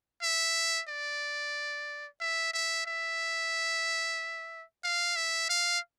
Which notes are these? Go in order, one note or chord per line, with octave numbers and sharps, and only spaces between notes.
E5
D5
E5
E5
E5
F5
E5
F5